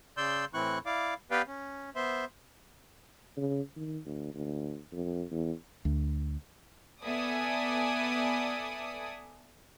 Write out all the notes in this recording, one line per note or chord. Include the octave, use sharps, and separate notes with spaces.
C#3 D5 C6 E6 G6
A2 E3 C4 E4 C#6 F#6
E4 D5 F5 D6
B3 G4 B4 D5 F5 G5
C#4
B3 C5 E5 C6
C#3
D#3
D2
D2
F2
E2
D2
B3 A4 D5 E5 G#5 D#6